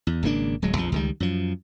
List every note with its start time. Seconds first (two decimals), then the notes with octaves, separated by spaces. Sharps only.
0.07 E2
0.23 G#1 C#3 A#3 D4
0.62 D1 F#3 G#3
0.77 A#1 F2 F3
0.92 C#2 D#3 G3
1.20 F#2 F3